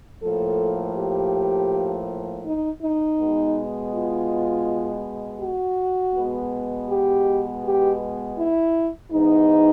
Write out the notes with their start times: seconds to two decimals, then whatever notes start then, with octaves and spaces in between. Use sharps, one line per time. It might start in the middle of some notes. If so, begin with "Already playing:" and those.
0.21 A2 F3 A#3 A4
0.95 G4
2.44 D#4
2.82 D#4
3.19 B2 G#3 B3
3.93 F4
5.41 F#4
6.15 B2 G#3 B3
6.90 G4
7.64 G4
8.38 E4
9.12 G#2 E3 G#3 B3 D#4